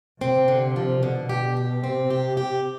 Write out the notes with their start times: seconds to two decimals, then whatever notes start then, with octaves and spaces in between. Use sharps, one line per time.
0.21 C3 C4
0.48 D3
0.76 F3
1.03 B2 D3
1.29 G4
1.57 G4
1.84 C3 C4
2.10 G4
2.37 G4